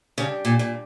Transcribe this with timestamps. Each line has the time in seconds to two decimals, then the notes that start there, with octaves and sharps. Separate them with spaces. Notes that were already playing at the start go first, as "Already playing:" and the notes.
0.18 C#3 G3 D4 G4
0.45 A#2
0.59 A#2